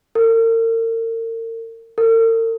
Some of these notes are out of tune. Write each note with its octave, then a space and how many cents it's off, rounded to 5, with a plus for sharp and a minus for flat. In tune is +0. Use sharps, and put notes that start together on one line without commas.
A#4 -40
A#4 -45